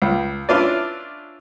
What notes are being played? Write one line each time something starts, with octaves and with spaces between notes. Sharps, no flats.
C#2
C#4 D4 E4 F4 B4 D5